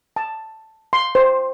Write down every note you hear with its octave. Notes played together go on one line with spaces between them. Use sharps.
A5
C6
C5